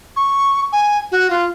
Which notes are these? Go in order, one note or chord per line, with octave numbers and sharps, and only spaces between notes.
C#6
G#5
F#4
F4